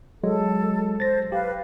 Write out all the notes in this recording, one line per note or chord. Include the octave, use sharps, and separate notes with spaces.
F#3 G#3 A4
C5 A6 A#6
G4 B4 F5